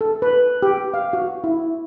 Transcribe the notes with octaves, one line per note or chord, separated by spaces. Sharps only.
A4
B4
G4
F5
F#4
E4